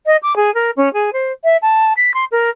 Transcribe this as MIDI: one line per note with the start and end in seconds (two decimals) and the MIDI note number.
0.06 0.16 75
0.22 0.35 86
0.36 0.53 68
0.54 0.70 70
0.76 0.91 61
0.93 1.10 68
1.13 1.32 72
1.44 1.57 76
1.62 1.93 81
1.97 2.14 95
2.14 2.24 84
2.31 2.50 70